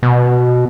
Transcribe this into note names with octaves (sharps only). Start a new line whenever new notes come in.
B2